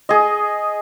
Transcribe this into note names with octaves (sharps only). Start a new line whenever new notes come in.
G#4 D#5